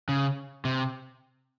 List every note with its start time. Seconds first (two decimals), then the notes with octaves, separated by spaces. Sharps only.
0.09 C#3
0.65 C3